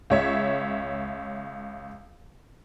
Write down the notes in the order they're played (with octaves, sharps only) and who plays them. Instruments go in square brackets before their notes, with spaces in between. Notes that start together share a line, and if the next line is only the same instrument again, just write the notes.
[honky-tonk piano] C#2 C#5 E5